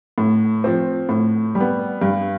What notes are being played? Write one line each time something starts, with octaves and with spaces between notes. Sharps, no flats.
A2
F3 C4
A2
G3
B3
G2